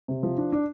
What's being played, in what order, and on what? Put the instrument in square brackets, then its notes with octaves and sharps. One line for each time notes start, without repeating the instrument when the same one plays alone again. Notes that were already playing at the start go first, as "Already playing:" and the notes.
[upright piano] C3
F3
D4
D4